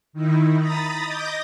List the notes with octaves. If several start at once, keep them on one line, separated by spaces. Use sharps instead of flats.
D#3 D#4 E4
A#5 B5 D#6 A6
D#5 D6 D#6 G6 A#6